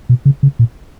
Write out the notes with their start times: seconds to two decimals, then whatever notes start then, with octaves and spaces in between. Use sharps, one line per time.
0.09 B2
0.25 C#3
0.43 C#3
0.59 A#2